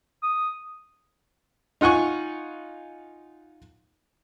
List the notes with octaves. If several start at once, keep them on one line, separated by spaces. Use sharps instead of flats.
D#6
D#4 F4 F#5 G#5 C#6